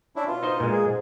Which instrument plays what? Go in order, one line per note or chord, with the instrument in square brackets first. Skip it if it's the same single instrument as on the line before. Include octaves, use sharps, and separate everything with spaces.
[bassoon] C#4 [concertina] D4 E4
[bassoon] B2 [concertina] F4
[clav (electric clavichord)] D#4 C5 D#5
A#2 G#3
[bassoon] G#4
G#2